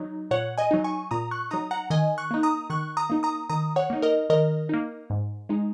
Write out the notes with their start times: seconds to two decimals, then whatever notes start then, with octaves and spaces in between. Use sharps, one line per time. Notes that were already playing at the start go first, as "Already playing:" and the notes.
Already playing: F#3 D#4
0.31 A#2 C#5 F#5
0.58 D#5 G#5
0.71 F#3 D#4
0.84 G#5 C#6
1.11 A#2 A#5 D#6
1.31 C#6 F#6
1.51 F#3 D#4 A#5 D#6
1.71 F#5 A#5
1.90 D#3 D#5 G#5
2.18 C#6 F#6
2.31 A#3 D#4
2.43 A#5 D#6
2.70 D#3 C#6 F#6
2.97 A#5 D#6
3.10 A#3 D#4
3.23 A#5 D#6
3.50 D#3 A#5 D#6
3.76 C#5 F#5
3.90 A#3 D#4
4.02 A#4 D#5
4.29 D#3 A#4 D#5
4.69 A#3 D#4
5.10 G#2
5.49 G#3 D#4